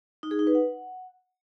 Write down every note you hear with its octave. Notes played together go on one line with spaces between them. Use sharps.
D#4
G#4
D#4
B4
F#5